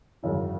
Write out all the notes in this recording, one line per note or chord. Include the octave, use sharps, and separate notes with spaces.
G#1 F#2 C#3 E3